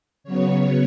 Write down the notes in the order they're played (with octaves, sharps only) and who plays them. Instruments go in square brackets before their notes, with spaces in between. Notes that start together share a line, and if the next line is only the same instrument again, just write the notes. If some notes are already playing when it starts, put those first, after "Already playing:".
[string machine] C#3 F#3 B3 C#5